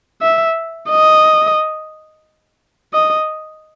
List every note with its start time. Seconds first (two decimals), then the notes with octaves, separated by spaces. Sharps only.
0.22 E5
0.90 D#5
2.93 D#5